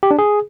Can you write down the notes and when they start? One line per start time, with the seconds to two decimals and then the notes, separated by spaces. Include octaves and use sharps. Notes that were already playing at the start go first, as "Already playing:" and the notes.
0.03 G4
0.11 D4
0.19 G#4